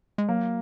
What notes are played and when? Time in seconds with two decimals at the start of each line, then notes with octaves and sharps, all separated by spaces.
0.18 G#3
0.28 F#3 A#3